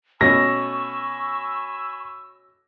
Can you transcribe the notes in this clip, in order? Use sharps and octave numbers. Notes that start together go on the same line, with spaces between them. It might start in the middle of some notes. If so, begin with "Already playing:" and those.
B2 A3 C#4 G#5 B5 C#6 E6 A#6